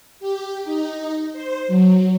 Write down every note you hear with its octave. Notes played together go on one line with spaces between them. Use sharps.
G4
D#4
C5
F#3